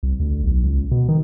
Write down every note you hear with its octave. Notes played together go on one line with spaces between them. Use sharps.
C2
D2
B1
C#2
B2
D#3